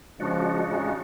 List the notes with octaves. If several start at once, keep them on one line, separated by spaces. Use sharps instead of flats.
C#3 F3 G#3 D4 F#4
A1 C#3